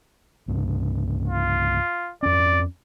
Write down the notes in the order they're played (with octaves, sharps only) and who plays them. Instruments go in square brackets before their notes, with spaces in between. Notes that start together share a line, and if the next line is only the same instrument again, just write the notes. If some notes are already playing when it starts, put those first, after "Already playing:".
[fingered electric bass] C2 G2 C#3
[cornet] F4
[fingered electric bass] F2 C#4 [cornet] D5